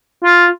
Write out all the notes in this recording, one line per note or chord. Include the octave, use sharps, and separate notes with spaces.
F4